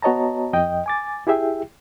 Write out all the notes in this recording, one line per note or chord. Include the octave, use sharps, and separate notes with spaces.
B3 F#4 C#5 D#5 A5 A#5
F2 D#5 G5
G#5 D6 A6
E4 G4 G#4 E5 G5